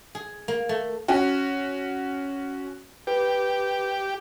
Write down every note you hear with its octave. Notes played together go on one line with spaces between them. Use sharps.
G#4
A#3
A3
C#4 F#4
G4 B4